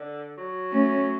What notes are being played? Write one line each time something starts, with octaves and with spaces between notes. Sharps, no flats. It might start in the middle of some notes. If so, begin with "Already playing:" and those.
Already playing: D3
F#3
A3 C#4